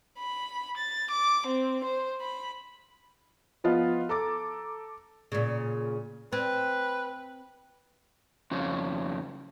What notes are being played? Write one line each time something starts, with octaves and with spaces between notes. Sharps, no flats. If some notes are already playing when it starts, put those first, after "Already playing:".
B5
A6
D6
C4
C5
B5
F3 B3 F4 D#5
A4 A#5 D6 A6
A#2 C#3
C4 B4
F2 C#3 C#4